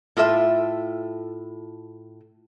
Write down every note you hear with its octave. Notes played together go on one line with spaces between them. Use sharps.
A2 F4 A4 E5